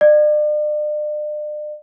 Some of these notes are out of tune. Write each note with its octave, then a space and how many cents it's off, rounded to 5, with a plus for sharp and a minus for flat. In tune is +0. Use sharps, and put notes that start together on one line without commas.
D5 +40